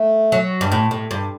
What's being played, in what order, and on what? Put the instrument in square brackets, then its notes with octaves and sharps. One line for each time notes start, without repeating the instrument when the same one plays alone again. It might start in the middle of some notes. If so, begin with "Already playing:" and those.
Already playing: [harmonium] A3
[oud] F#3
G2
A2
A2
G2